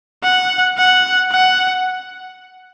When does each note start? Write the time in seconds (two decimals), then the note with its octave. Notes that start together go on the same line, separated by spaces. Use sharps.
0.24 F#5
0.78 F#5
1.32 F#5